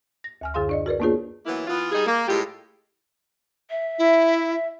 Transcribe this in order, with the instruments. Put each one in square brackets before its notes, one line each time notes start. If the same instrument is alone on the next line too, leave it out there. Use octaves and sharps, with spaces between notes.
[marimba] A#6
D2 G#5 F6
F#2 D3 G#4 F5 C6
D4 D5 D#5
F#4 A#4 B4 D5
A#3 B3 D4 F4 G#4 C#5
[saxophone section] E3 F#3 A#3 B3 E4
E3 B3 F4
G3 D#4 G#4
A#3
A2 G#3 F4 G4
[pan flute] E5
[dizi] E4